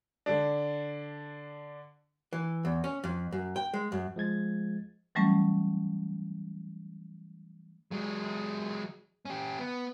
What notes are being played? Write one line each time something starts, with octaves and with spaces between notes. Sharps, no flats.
D3 D4
E3
E2
C#4
F2
F#2
G5
G#3
F#2
F3 G#3 G#6 A6
E3 F#3 G3 A3 C#4
F#3 G#3
C#4 G4
B3